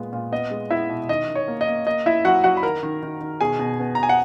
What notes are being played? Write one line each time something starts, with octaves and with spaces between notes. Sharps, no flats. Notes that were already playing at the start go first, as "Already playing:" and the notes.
Already playing: A#2 G#3 B3
A#2
B3 D#5
G#3
B3 E4 E5
B2
D#3 D#5
D#3
C#5
A#3
D#5
A#3
A#3 D#5
A#3 E4 E5
F#3 F#4 F#5
F#3 F#4 F#5
B5
D#3 A#4 A#5
D#3
D#3
D#3
B2 G#4 G#5
B2
B3
B2 A#5
G#5
F#5